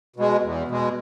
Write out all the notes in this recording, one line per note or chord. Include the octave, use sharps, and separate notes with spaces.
B2 G#3
E2
B2 G#3